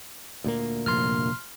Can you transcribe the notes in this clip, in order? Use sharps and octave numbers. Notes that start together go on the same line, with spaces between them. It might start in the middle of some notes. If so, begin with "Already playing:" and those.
D2 A#2 A#3
F1 A#1 G2 C6 F6